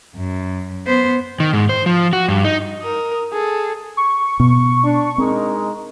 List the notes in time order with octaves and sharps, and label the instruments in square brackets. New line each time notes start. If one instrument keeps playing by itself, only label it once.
[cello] F#2
B3 C5
[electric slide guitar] D#3
G#2
C5
F3
F#4
G2
D#4
[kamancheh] A#4 D#6
G#4 A4
[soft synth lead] C#6
[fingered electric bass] B2
[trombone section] D4
[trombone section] G#3 D#4 A#4 [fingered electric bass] C4